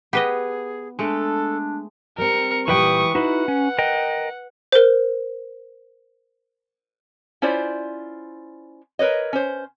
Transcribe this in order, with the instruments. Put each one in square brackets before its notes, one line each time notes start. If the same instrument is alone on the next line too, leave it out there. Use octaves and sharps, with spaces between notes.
[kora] B3 [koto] G4 B4 D#5 [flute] G#4
[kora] G#3 A3 [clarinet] D4 [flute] A4
[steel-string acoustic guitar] G3 C4 [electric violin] A#4 C#7
[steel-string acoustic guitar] A#2 G3 [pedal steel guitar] E3 B4 G5 [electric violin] C#6 D#6
[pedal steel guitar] D#4 E4 F#4 [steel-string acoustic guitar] B4 [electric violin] F#5
[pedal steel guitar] C#4
A#4 D#5 G5
[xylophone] A#4 C5
[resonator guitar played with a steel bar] C#4 E4 F4 C5 D5
A#4 B4 C#5 D#5
C#4 C5